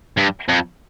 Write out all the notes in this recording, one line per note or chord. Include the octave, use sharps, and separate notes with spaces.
G2
F2